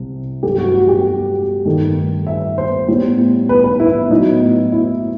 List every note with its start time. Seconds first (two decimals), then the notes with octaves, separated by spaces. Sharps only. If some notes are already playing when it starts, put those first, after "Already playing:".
Already playing: C2 C3
0.43 G2 F#3 A3 G4
0.58 F#4
0.74 F#4
0.89 G4
1.65 G2 D#3 A3
2.27 E5
2.58 C5
2.88 A2 G3 B3
3.49 B4
3.64 B4
3.80 E4
4.11 A2 F#3 B3 D#4
4.72 E4